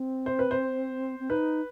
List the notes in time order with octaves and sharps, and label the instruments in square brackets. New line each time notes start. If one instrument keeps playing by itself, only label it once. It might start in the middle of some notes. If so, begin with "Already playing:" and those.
Already playing: [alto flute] C4
[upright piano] C5
B4
C5
[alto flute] C4
[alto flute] D#4 [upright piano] B4